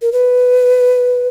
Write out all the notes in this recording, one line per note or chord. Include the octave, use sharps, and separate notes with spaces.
A#4
B4